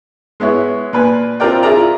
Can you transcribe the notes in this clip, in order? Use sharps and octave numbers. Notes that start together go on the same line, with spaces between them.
G#3 B3 E4 C#5
A#2 B4 G#5
C4 F4 G4 A#4 D5 G5
E4 F4 G#4 A#4 D5 A#5